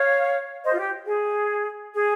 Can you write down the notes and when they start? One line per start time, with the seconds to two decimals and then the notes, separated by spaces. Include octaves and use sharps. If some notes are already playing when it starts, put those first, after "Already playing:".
Already playing: C#5 F5
0.64 C5 D#5
0.73 F4
0.78 G4
1.07 G#4
1.95 G#4